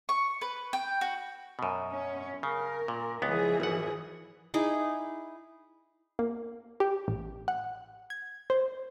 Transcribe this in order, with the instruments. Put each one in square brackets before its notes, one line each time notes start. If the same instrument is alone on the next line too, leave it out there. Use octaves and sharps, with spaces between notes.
[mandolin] C#6
B4
G5
F#4
[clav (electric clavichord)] F#2 B2
[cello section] C#4
[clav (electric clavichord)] C#3 [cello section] A#4
[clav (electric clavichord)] A#2
[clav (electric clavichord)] C#2 B3 [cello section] E3 F3 G#4
[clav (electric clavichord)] G#1 F#5
[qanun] D#4 E4 G#4 D6
[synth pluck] A#3
G4
A1
F#5
G#6
C5